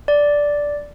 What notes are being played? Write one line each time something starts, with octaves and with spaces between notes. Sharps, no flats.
D5